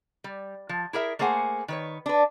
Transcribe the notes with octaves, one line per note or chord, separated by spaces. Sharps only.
G3
F3
E4 G#4 A#4 E5
A3 A#3 G#4 C5 F#5 G#5
D#3 B4 C#5
D4 B4